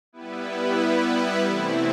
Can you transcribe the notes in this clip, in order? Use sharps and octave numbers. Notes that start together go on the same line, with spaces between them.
G3 B3 E4 B4
C3 E3 A3 C4 E4